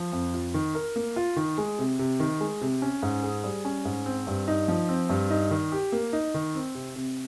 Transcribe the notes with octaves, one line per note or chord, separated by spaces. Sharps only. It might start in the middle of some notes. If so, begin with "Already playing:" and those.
Already playing: F3
F2
F4
D#3
A#4
A#3
F4
D#3
G#3
C3
C3
D#3
G#3
C3
C#4
G#2
G#4
G3
C#4
G#2
C4
G2
D#4
F3
C4
G2
D#4
D#3
G4
A#3
D#4
D#3
C4
C3
C3